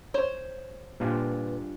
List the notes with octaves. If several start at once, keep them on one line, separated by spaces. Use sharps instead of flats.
C5 C#5
A#2 G3 D4 F4 B4